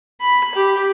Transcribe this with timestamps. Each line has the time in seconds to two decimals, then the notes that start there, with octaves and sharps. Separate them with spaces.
0.21 B5
0.55 G4